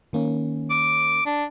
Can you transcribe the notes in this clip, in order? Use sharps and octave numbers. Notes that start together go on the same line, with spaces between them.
D#3 A#3 C#4
D6
D4